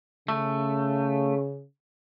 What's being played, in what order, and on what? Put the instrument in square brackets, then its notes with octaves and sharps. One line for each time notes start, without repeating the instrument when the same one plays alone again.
[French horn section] C#3 [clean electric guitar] A3